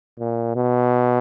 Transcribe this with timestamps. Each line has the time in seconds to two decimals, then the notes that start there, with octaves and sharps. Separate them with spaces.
0.19 A#2
0.56 B2